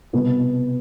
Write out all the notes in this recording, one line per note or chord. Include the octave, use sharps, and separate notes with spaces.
C2 B2 B3